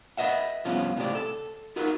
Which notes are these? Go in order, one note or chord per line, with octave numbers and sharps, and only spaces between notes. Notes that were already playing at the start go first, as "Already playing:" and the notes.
B4 C5 D#5 E5 F#5
G2 C3 F3 B3 C#4 F4
C#2 A2 C3 G4 D5
A4
D#4 F4 F#4 A#4 B4